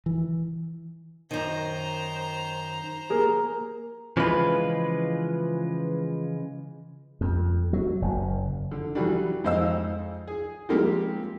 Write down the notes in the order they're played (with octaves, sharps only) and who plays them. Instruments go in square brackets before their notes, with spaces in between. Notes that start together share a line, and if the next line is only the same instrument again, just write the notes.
[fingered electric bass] E3
[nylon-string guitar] F#2 D#3 [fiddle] C5 A#5
[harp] A#3 [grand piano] G#4 A#4
[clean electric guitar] C#3 E3 F3 G#3 F4 B4
[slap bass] F2
F#3
F#1
[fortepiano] D3
E3 F#3 G3 D4
F2 G#2 C5 D#5 F5 E6
G#4
F3 G3 G#3 A#3 C4 G4